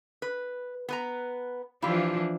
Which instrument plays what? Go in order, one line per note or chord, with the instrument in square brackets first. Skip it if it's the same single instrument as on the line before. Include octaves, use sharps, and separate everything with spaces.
[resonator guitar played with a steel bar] B4
B3 B4 A#5
[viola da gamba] E3 F3 D4 [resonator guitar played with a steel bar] E4 F4 G4